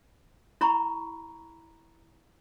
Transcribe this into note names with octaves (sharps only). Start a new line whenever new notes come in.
E4 A#5 B5 C#6